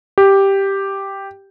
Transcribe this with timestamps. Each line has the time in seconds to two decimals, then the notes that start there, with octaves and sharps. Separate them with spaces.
0.18 G4